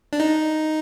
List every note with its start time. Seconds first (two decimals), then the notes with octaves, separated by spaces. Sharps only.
0.13 D4
0.20 D#4